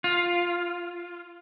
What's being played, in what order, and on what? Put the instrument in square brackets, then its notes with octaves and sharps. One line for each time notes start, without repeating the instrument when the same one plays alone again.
[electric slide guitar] F4